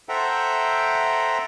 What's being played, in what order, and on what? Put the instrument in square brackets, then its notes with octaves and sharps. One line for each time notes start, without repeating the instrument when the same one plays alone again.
[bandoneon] A4 C5 E5 F#5 G5 A#5